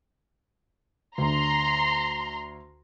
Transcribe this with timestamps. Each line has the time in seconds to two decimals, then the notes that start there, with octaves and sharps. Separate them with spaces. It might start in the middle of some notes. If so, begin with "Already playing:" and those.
1.18 D2 D3 A#5 C6